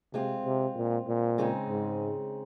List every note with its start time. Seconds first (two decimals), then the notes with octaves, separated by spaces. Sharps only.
0.13 C3 G#3 C4 F4
0.45 C3
0.76 A#2
1.07 A#2
1.38 C#3 G#3 C4 D#4 G#4
1.69 G#2